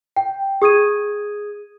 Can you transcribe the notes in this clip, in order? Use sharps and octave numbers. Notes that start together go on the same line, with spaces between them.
G5
G#4 D#6 G#6 D#7